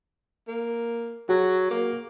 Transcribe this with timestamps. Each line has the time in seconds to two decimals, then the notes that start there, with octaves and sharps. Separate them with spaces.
0.48 A#3
1.29 F#3 F#4 G#4
1.71 A#3